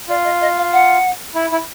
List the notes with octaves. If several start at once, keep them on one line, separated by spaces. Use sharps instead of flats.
F4 D5
D#5
D#5
F5
F#5
E4
E4